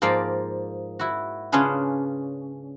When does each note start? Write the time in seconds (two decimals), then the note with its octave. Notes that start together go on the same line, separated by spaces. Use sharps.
0.02 G#2 F3 A#3 D5 F5
0.99 E4 F#4
1.52 C#3 C#4 D4 F4 G#4 B4